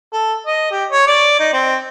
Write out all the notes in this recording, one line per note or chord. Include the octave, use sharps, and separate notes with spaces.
A4
D#5
G4
C#5
D5
D#4
C4